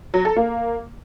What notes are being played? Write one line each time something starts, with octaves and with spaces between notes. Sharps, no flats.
F#3
A4
A#3